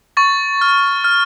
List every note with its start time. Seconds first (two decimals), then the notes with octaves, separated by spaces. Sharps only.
0.17 C#6 A6
0.61 F6
1.04 F6